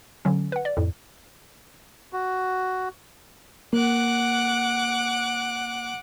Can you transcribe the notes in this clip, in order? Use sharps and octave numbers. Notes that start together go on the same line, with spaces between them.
D3 F#3 C#4
B4 F#5
D5
F2 A2
F#4
A#3 F#5 D6 F#6